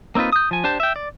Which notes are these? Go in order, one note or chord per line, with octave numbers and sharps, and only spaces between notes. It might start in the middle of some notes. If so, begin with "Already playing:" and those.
A#3 C4 D#4 F4 B4
D#6 G6
F3 G#5
D4 G4 C5 A5
E5 G5
D5